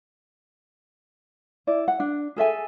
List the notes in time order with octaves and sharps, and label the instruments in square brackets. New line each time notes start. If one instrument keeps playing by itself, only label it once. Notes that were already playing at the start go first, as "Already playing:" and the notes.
[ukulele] E4 D5
F#5
D4
G#4 A4 E5 G#5